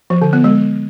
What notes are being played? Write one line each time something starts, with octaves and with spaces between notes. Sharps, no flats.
F3
D3
B3
G#3